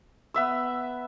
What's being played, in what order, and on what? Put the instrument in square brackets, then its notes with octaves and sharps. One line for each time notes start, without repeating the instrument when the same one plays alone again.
[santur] B3 E5 E6